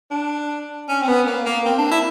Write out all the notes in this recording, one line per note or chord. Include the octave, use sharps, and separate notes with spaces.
D4
C#4
C4
B3
A#3
A#3
C4
D4
E4